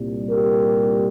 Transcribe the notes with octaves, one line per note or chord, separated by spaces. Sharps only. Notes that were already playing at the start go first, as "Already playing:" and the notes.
Already playing: C2 A#2 G3
G4 A#4